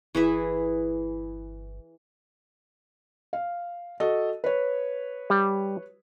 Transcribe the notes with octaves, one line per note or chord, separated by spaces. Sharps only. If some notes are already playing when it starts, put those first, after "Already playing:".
G1 E3 G#4 E5
F5
F#4 A4 D#5
B4 C#5
G3